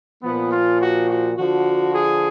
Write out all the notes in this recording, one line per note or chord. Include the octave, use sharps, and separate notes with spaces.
A#2 F3 B3
F4
F#4
F#4
D3 F3 F#4
G#4